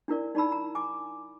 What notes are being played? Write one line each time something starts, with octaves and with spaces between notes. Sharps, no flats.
D4 E4 A#4 D5
D#4 D5 A5 B5 E6
A#5
G#5 D6